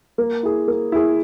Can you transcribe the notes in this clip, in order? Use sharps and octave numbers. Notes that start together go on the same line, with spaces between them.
A#3
E4 G#4
A#3
E4 G#4